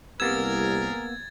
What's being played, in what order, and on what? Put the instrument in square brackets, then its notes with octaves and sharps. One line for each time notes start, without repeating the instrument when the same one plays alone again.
[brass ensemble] C2 [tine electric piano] A#3 B3 E6 [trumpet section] G#4 A#4 [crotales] G#6 A6